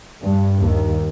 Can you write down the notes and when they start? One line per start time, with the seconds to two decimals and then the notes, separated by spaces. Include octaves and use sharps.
0.24 G2
0.62 D#2